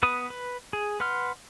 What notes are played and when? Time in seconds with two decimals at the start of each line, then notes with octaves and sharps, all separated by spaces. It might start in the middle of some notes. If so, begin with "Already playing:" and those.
0.03 B3 B4 D#6
0.30 B4
0.73 G#4
1.00 B4 F#5 C6 F6